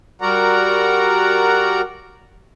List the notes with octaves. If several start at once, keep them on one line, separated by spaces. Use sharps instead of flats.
G3 F#4 A#4 D5 F#5 A#5